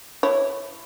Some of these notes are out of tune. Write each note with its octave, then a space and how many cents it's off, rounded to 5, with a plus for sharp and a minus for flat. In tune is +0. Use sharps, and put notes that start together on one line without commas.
E4 +10 C#5 -10